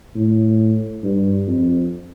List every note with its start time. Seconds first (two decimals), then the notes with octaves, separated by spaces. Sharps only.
0.15 A2
1.03 G2
1.47 F2